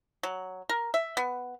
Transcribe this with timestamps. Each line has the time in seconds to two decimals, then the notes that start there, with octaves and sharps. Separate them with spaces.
0.23 F#3
0.69 A#4
0.94 E5
1.17 B3